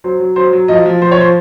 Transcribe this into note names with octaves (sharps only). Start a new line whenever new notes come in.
F#3 C5
F#3
F#3 C5
F#3
F3 D#5
F3
F3 C5
C#5
F3 C5